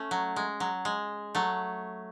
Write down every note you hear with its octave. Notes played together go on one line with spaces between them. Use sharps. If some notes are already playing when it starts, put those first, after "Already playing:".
Already playing: A3 C#4
F#3
G#3
F#3
G#3
F#3 A3